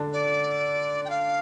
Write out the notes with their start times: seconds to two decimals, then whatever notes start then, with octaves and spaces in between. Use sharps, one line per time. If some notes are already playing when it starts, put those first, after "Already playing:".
Already playing: D3 D4
0.13 D5
1.05 G5
1.10 F5